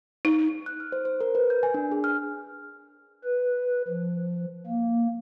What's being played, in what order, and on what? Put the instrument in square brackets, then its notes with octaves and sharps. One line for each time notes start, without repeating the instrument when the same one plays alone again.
[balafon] D#4
[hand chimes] F#6
F6
C5
C5
A#4
B4
G6
G#5
D4
G#4
F6
[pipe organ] B4
F3
A#3